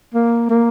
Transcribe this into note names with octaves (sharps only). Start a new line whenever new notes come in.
A#3
A#3